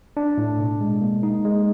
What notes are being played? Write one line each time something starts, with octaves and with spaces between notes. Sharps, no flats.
D4
A2
B2
G#3
A#3
D#4
G#3